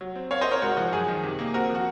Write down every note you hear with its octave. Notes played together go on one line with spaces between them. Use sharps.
F#3
C4
C4 C#5 F5
C5 D#5
C4 A#4 C#5
G#2 F#4 A#4
F3 F#4
F#2 G#4
D#3
C3
A#3
C4 F#4 A#4
F3
F#4